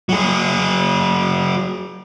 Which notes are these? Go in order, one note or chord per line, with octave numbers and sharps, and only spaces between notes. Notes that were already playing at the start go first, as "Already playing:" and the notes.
F#3 G#4